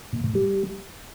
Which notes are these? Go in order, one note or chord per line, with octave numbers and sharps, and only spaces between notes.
A#2
A2
G3